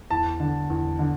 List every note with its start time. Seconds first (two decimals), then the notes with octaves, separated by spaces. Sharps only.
0.11 E2 A5
0.40 D3
0.70 E2
0.99 D3